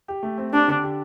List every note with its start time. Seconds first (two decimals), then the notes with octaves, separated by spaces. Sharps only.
0.08 G4
0.23 A3
0.38 C4
0.53 D4 G4
0.68 D3
0.83 G4